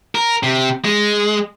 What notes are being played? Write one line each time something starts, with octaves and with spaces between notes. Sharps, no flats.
A#4
C3
G#3